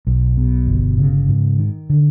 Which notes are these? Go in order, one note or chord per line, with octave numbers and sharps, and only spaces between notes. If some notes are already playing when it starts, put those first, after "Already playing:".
B1
B2
G1
C#3
G#2
D#3
D3